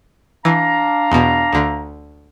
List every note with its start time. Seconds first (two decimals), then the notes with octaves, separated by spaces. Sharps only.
0.45 E3 D4 F5 A#5
1.12 E2 B2
1.53 D2 D3